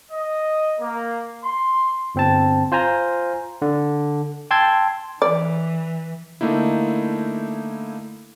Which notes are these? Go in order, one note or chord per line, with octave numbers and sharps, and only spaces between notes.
D#5
A#3
C6
G1 C4 A5
F4 C5 G#5 A#5
D3
G5 A5 C6 E6 G#6
E3 D5
D3 A3 A#3 D#4 E4